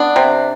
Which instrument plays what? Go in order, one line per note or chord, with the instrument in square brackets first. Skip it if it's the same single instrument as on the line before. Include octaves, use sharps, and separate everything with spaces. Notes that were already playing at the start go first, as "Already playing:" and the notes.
Already playing: [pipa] B3 D4
C3